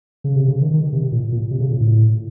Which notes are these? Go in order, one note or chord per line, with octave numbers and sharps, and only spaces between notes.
C#3
C3
C#3
D#3
D#3
C3
A#2
A#2
C3
C#3
A#2
A2